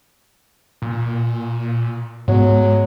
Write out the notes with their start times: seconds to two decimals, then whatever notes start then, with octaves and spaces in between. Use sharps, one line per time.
0.82 A#2
2.28 G#2 F#3 G#3 B3